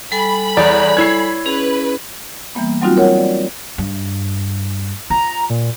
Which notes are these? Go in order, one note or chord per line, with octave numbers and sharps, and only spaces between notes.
G3 A4 G#5 B5
E2 C#5 D5
E4 C#5 G#6 C7
C#4 G#4 B4
E3 G3 A#3 B3
F#3 G3 C4 D#4 F4 F#4
A#4 C#5 F#5
D5
G2
F4 A#5
A#2